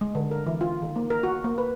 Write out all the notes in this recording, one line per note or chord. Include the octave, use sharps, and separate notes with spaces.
G#3
D3
A#4
E3
F4
D#3
A#3
A#4
F#4
A#3
B4